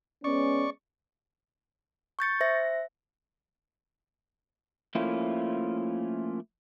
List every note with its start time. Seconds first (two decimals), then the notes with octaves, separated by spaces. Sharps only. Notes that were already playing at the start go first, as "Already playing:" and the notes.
0.24 G#3 B3 C#4 D5 C#6
2.19 C#6 G6 A6 C#7
2.41 C5 E5 A#6
4.95 F3 A3 A#3 C#4 E4 F4